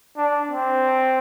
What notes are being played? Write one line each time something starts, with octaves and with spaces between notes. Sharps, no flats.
D4
C4